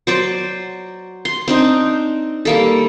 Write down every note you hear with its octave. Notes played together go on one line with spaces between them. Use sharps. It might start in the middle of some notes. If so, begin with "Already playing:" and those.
F#3 C5 D5
C6
C4 D4 D#4
G3 A#3 A4